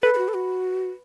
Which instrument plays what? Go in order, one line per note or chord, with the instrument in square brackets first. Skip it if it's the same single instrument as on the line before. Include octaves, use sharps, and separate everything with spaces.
[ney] A4 [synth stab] B4
[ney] A4
F#4
A4
F#4